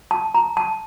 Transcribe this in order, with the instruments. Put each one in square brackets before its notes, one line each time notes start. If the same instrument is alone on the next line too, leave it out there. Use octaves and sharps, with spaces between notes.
[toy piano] A5
A#5
A5